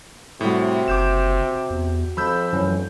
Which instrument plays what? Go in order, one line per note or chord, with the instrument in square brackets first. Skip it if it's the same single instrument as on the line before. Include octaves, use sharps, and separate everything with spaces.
[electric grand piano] A2 G3 [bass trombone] C3 [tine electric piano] F#4 G4
[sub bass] F#1 [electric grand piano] D6 G6 E7
[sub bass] E2
[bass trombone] F2 [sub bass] F3 [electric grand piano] B5 E6 G6
[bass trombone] F1 [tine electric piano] F#2 E3 C#4